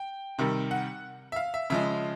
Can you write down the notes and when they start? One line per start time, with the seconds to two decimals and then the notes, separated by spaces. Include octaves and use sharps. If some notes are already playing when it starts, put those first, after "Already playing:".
Already playing: G5
0.38 C3 D#3 G3
0.71 F#5
1.32 E5
1.36 F5
1.54 E5
1.70 C#3 F3 G#3 E5